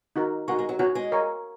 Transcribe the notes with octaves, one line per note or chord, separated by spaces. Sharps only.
D#4 F#4 A#4
G#3 D#4 F#4 A#4 F#5 C#6
G#3
F#3
F#3 F#4 C#5 G#5
G#3
A#4 C#5 G#5 C#6